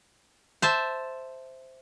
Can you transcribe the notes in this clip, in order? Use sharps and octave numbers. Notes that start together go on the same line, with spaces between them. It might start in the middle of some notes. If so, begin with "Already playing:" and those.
C5 E5 A5